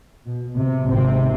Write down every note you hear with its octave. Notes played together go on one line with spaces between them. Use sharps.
B2
C3
G#1 C3 C4